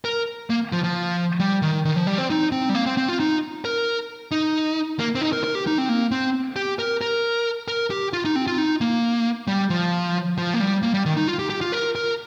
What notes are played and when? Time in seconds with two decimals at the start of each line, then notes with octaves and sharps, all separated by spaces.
0.05 A#4
0.50 A#3
0.72 F3
0.84 F3
1.40 G3
1.62 D#3
1.85 D#3
1.96 F3
2.07 G3
2.18 C4
2.30 D#4
2.52 C4
2.69 G3
2.75 A#3
2.86 C4
2.97 C4
3.08 F4
3.20 D#4
3.65 A#4
4.31 D#4
4.99 A#3
5.15 C4
5.21 D#4
5.33 A#4
5.44 A#4
5.55 G4
5.67 D#4
5.78 C4
5.89 A#3
6.11 C4
6.56 G4
6.79 A#4
7.01 A#4
7.68 A#4
7.90 G4
8.13 F4
8.25 D#4
8.36 C4
8.47 F4
8.58 D#4
8.81 A#3
9.48 G3
9.70 F3
10.38 F3
10.54 A#3
10.60 G3
10.83 A#3
10.94 G3
11.05 D#3
11.17 D#4
11.28 F4
11.39 G4
11.50 G4
11.61 F4
11.72 A#4
11.95 A#4